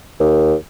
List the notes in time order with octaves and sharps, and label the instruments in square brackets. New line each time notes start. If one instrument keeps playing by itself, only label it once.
[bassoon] D#2